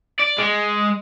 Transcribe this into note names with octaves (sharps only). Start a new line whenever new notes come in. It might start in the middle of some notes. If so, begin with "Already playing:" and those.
D5
G#3